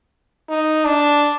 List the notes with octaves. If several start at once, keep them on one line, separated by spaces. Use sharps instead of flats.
D#4
D4